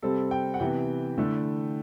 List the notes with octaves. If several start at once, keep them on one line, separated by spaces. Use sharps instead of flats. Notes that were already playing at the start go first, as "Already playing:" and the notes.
C3 G3 C4 A4
G5
F#5
C3 E3 B3 G5
D3 A3 E4